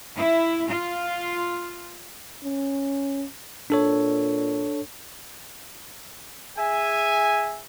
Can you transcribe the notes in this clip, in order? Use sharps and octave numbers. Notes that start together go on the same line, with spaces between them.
E4
F4
C#4
A#2 D4 A4 C#5
G#4 E5 G#5